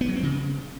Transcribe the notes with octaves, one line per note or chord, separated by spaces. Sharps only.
B3
F#3
C4
C#3